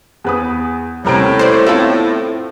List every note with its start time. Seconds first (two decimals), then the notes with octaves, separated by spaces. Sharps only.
0.24 E2 B4 D#6
1.05 D#1 A2 C3 G3 A#4 D7
1.39 B4 C5 D5
1.67 B3 C4 E4 F4 A4